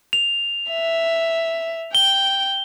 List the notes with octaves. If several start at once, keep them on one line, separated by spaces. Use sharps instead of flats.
F7
E5
G5 G7